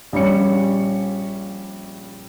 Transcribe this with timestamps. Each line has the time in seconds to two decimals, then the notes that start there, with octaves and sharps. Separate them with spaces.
0.13 A#1 G3 C#4 C#7